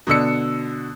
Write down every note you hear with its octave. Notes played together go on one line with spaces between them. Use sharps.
B2 D3 E6 C#7